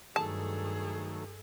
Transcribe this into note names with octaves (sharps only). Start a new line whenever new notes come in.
G2 D#3 F#3 A3 G#4 A4 A5